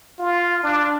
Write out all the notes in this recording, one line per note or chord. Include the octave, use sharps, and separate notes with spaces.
F4
D4